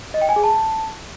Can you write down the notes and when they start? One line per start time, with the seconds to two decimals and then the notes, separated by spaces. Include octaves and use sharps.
0.14 D#5
0.21 G5
0.29 G#5
0.36 G#4
0.44 A5